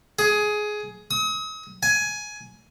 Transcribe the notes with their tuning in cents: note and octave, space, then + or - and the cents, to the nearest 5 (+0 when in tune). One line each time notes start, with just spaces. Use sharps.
G#4 +15
D#6 +40
G#5 +15